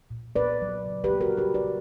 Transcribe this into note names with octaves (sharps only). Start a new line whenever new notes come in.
A#2
A#2 B4 D5
F#3
C#3
G4 B4
A#3
F#4 A#4
C#3 G4 B4
B4 D5
C#3